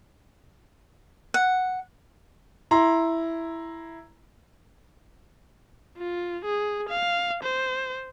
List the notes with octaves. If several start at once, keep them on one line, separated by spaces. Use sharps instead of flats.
F#5
E4 A#5 C6
F4
G#4
F5
C5